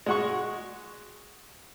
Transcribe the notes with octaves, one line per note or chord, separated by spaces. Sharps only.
G#3 F#4 C#6